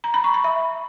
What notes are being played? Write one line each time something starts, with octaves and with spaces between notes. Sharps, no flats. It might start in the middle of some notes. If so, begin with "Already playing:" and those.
A#5
B5
C#6
B5
E5